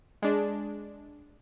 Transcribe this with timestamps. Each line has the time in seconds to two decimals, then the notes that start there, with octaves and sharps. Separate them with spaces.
0.22 G#3 D4